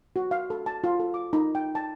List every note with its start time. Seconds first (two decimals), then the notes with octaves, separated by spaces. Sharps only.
0.16 F#4
0.31 F5
0.50 A4
0.66 A5
0.84 F4
1.00 A4
1.14 D6
1.33 D#4
1.55 G5
1.75 A5